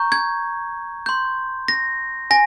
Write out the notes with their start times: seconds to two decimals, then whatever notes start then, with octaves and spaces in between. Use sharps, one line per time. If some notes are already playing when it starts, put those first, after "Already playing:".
Already playing: A#5 C#6 G6
0.12 G#6
1.06 C6 G6
1.68 A#6
2.31 G#5 A#6